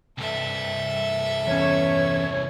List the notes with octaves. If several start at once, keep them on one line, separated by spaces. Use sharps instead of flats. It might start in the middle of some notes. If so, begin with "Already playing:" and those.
C2 G2 A4 E5
E2 C#4 C#5